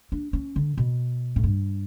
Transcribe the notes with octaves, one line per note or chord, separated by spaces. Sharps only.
D4
C#4
D3
B2
A2
G2